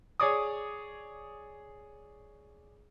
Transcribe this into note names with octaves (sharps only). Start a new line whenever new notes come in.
G#4 C#5 D5 D#6